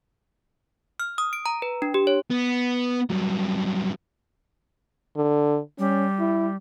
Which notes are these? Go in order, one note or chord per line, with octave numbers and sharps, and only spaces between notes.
F6
D#6
D7
A#5
B4
D4
G4
C#5
B3
G2 F#3
D3
G3 C#4
E4